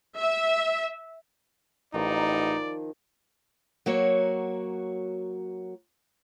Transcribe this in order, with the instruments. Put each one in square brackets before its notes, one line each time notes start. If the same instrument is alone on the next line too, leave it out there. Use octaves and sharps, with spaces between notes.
[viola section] E5
[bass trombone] A1 [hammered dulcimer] D#3 F3 D6 [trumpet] D#4 [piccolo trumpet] D5
[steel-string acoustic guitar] F#3 A#3 F#4 C#5